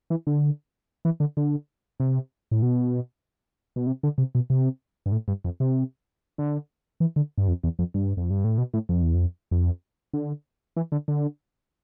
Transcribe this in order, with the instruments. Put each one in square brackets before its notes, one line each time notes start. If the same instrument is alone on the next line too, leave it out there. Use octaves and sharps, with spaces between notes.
[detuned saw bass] E3
D3
E3
D3
D3
C3
A2
B2
B2
C3
D3
C3
B2
C3
G2
A2
G2
F2
C3
D3
E3
D3
G2
F2
E2
F2
G2
F2
G2
A2
B2
A2
F2
E2
F2
F2
D3
E3
D3
D3